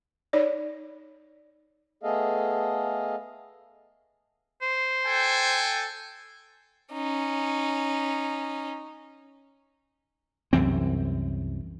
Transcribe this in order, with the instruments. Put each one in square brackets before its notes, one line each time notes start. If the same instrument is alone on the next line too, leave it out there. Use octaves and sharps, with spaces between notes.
[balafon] D#4 C#5 D5
[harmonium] A3 B3 G#4 A4 D#5 F5
[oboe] C5
[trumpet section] A4 G5 G#5
[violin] C#4 D#4
[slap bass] C2 F#2 E3 C4